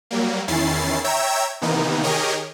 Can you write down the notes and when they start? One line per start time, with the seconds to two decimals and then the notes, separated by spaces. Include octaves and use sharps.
0.11 F#3 G3 A#3
0.48 E2 D#3 C#4 E4 A6 C7
1.04 C#5 E5 G5 A#5 E6 G#6
1.61 C3 D#3 E3 A#3 B3 D#4
2.03 D#3 G4 G#4 A#4 C#5 D#5